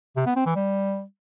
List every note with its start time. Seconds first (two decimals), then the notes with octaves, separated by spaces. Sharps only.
0.16 C3
0.26 B3
0.36 C4
0.46 E3
0.55 G3